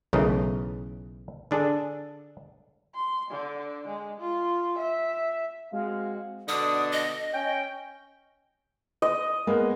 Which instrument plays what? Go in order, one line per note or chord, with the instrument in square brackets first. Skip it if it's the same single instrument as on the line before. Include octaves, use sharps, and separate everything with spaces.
[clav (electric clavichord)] B1 C#3 E3 A3 A#4 D#5
D3 D4 G#4 A4
[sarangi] C6
D3
G#3
F4
E5
[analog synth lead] G#3 [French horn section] C4 F#4 [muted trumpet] F5
[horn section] B2 D3 D4 [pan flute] D#6
[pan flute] D#5
[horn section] C#4 G5
[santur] D#5
[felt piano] G#3 A#3 B3